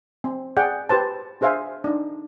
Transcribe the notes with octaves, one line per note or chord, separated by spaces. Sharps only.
C4
G#4 D5 F#5 G5
G4 B4 C5 A5
D4 G#4 C5 E5 F5 G#5
D4 D#4